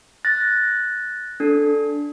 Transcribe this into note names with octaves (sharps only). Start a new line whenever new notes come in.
F#6 A6 A#6
D4 A4